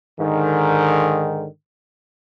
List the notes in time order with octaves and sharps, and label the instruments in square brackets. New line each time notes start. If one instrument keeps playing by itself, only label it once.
[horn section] G#2 D3 D#3